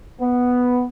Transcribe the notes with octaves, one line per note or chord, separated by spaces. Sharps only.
B3